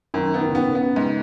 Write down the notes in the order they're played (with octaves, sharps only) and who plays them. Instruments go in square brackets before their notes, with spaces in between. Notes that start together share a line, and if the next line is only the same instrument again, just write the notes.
[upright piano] F#2 [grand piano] D#3
[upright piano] B3
[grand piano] D#3
C#3
[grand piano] D#3 [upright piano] B3
[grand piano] C#3
[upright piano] B3
G#2